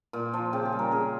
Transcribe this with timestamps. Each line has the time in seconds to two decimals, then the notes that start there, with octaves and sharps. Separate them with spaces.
0.13 A#2
0.34 F3
0.53 C#3 G4
0.65 G#4
0.73 G3
0.79 A#4
0.92 C#3 G#4